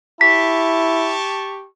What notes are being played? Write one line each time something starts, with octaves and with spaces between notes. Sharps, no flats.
E4 G4 A5 C#6 B6